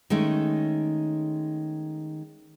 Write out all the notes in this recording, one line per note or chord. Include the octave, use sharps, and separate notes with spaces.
D#3 G#3 A3 C#4